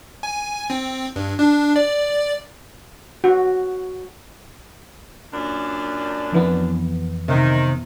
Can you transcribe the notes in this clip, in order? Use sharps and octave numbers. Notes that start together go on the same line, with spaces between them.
G#5
C4
G2
D4
D5
F#4
F#2 A#2 D4
F2 E3 B3
C3 D#3